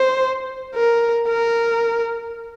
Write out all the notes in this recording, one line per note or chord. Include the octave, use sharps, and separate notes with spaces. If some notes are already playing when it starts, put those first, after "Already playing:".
Already playing: C5
A#4
A#4